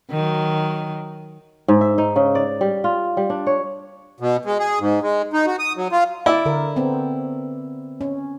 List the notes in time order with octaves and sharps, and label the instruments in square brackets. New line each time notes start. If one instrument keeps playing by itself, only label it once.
[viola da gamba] D#3 F#3
[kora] G#2
E5
D#4
C#3
D5
G3
F4
G3
D4
C#5
[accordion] B2
G#3
G#4
G#2
G#3
D#4
F#4
D#6
F#3
F4
[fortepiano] E4 [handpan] D5
[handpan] D3 A#4
B3 C4
C#4